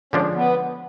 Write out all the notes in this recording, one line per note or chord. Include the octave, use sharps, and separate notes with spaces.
D3 F3 G#3 C#4 D4 F4
B3